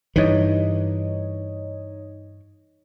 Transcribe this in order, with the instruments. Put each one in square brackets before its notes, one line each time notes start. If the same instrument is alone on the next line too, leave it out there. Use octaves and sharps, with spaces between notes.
[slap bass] G2 E3 [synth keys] D#4 C#5 D#5